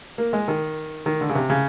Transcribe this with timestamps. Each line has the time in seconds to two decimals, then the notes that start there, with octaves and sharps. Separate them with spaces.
0.18 A#3
0.33 G#3
0.48 D#3
1.06 D#3
1.21 D3
1.29 C#3
1.35 C3
1.50 C#3